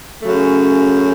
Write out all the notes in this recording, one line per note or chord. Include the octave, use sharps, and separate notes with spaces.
F#2 C#3 F#3 A3